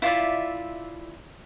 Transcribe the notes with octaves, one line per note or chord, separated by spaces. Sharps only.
E4 F4 D5 E5